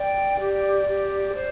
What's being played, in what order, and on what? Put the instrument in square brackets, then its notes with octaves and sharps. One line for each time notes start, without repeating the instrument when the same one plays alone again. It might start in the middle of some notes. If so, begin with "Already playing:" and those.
Already playing: [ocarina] D5 [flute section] G5
[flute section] G4
G4
C5